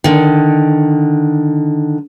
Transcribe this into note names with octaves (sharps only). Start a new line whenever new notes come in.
D3 D#3